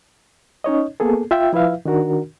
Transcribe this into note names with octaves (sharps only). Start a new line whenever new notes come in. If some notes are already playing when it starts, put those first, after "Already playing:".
C#4 D#4 C#5 D#5
A#3 B3 G#4 A4
F4 E5 G5
F3 E4 B4 E5 F5
D#3 D4 F#4 A#4